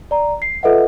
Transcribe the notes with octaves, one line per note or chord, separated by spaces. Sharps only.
D5 A#5
C7
F4 A4 B4 D#5 E5 F#5